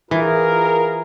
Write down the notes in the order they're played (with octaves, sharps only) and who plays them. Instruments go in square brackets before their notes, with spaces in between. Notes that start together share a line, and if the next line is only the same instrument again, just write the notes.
[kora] E3 [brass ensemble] F4 G#4 A#4